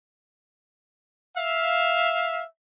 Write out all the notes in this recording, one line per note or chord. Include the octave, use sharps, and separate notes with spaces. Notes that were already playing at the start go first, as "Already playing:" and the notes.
E5 F5